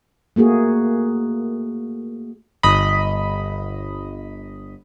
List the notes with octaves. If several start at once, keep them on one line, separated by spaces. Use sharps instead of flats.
A3 A#3 F#4 G#4
G1 D#5 B5